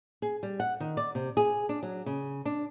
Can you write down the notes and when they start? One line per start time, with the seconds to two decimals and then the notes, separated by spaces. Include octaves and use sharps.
0.22 G#4
0.43 G3
0.60 F#5
0.80 D#3
0.97 D5
1.15 C3
1.37 G#4
1.69 D4
1.83 F#3
2.06 C#3
2.45 D4